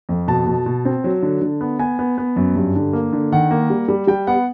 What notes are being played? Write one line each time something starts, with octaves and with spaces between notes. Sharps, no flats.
F2
B2 A5
B2
B2
C4
F#3
D3
D3
B3
B3 G#5
B3
B3
F#2
G2
D3
A#3
D3
D#3 F#5
A#3
G3
G3
G3 G5
B3 F#5